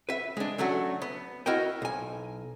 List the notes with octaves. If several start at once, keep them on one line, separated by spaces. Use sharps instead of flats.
B4 E5
G#3 D4
F#3 A3 C#4 D4 F#4
B3
E4 F#4 A#4 D#5 G5
B1 G#5